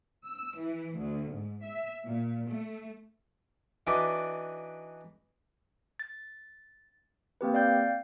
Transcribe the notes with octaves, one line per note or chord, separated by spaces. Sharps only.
E6
E3
D2
G#2
E5
A#2
A3
E3 D4 D#4 F#4 D5 E5
A6
A#3 C4 G4 B4
D5 F5 G5 G6